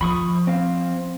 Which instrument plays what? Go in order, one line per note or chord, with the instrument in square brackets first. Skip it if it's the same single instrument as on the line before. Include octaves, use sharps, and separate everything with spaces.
[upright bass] F3 [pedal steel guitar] B5 C#6 D#6
[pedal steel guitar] C4 F5